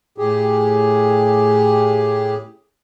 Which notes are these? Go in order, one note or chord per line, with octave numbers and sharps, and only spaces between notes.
A2 G4 G#4